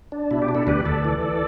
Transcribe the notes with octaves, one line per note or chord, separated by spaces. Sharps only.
D4
B2 E4
G4
D4
E4 A4
D2 G4 B4
D2 A4 D5
E3